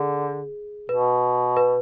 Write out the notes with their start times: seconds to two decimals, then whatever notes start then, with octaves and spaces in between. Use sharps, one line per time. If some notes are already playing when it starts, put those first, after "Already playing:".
Already playing: D3 G#4
0.89 B2 B4
1.57 B4